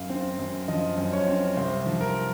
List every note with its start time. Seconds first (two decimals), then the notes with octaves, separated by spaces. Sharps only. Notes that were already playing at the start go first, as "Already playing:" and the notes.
Already playing: F#2 F5
0.10 C4
0.39 F#2
0.68 F3 D#5
0.98 F#2
1.13 C#5
1.28 C4
1.57 C2 C5
1.86 F3
2.01 A#4